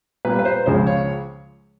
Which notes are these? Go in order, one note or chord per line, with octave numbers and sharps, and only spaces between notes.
A#2 G3 A#3 B4
B4
C5
C#2 C#3 F3 G#3 C5
C#5